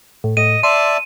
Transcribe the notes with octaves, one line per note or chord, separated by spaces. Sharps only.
A2
A2 D#5 D#7
D5 E5 A5 C6 D#7